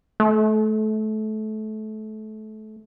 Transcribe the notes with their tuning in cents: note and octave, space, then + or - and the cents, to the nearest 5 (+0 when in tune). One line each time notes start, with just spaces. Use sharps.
A3 -25